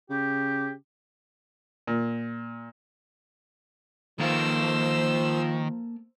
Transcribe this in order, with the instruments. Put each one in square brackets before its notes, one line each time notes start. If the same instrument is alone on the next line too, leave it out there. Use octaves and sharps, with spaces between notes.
[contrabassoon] C#3 [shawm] G4
[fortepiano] A#2
[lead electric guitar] D#3 [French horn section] F3 [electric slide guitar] A#3 A4 F5 [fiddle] C5 E6